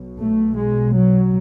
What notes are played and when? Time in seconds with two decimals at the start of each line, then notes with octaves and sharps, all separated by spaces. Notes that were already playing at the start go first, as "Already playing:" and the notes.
Already playing: B1 B2
0.19 A3
0.56 G#3
0.94 F#3